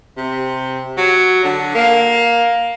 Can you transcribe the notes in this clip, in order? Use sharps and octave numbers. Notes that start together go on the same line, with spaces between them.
C3
F#3
D3
A#3